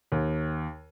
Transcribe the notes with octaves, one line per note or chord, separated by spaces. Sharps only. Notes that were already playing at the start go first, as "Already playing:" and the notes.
D#2